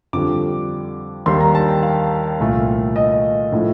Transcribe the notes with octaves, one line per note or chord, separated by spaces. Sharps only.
F2 D3 G3 D6
D#2 D#3 G3 C6
A#5
A5
G5
F5
C2 A#2 A3
D#5
A2 F3 A3